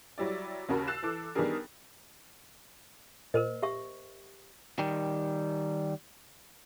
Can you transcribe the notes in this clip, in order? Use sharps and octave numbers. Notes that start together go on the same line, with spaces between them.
F#3 G3 E4 D5
D#2 C#3 F#4 A#4 A5 B5
E6 F#6 A6 C7 E7
E3 A4 D6
D#3 G3 B3 D4 G#4 A#4
A#2 A#4 C5 D#5
G4 E5 C#6
D#3 G3